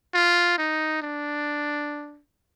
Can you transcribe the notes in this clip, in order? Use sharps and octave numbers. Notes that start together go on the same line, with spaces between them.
F4
D#4
D4